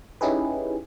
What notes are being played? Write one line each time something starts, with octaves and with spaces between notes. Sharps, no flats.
C#4 D#4 E4 G4 G#4 B4